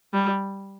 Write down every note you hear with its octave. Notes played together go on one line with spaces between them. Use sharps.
G3